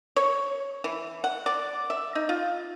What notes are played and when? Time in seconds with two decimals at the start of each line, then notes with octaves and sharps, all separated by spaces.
0.16 C#5
0.84 E3
1.24 F#5
1.46 D5
1.90 E5
2.15 D#4
2.29 F4